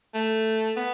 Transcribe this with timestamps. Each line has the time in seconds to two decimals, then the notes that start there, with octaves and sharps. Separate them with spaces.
0.14 A3
0.77 B3